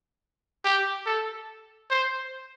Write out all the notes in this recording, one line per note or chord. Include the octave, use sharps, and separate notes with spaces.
G4
A4
C5